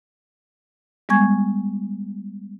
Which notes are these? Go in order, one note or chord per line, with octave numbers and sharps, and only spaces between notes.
G3 G#3 B3 G#5 C#6 G#6